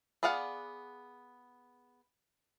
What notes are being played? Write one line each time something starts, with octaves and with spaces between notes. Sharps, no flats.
B3 G#4 D5 F5 F#5